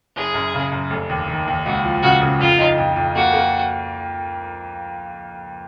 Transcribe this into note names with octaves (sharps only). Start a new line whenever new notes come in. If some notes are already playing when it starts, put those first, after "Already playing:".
F#1 G#4
F#2
C#3
F#2
F1
D#2
D#3
D#2
C#2 F#4
F3
C#3 F#4
C#3
F2 F4
D#4
F2
F2
A#3 F#4
A#3